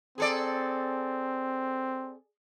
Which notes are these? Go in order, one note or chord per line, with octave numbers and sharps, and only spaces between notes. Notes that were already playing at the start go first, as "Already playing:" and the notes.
C4 G#4 A4 D5